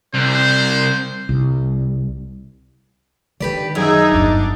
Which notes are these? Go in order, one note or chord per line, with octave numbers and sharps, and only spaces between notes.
C2 C5
C2
D3 D#3 G4 B4 D5
F#2 D#4 G#4 E5
G1 E2 D4